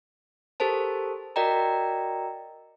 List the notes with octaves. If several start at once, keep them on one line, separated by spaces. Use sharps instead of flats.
G4 A4 A#4 C5 A5
F#4 A#4 D5 D#5 G5 A#5